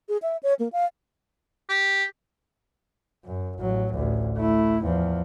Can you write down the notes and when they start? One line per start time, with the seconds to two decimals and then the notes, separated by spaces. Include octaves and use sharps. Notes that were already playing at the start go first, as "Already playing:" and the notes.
0.09 G#4
0.22 E5
0.43 C#5
0.59 A#3
0.73 F5
1.69 G4
3.25 F#2
3.59 A1 F#3
3.94 A1 D2
4.37 A3 E4
4.82 E2 F3